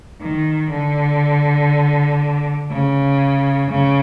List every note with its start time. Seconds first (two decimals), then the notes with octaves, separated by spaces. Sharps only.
0.21 D#3
0.71 D3
2.71 C#3
3.70 C#3